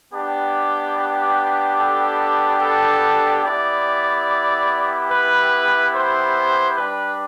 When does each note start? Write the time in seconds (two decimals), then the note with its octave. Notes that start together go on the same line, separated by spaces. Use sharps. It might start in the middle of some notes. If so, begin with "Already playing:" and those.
0.13 B3 D4 G4
0.96 B4
1.79 A4
2.62 A4
3.46 B3 E4 G4 D5
5.11 B4
5.95 C5
6.77 G3 D4 G4 B4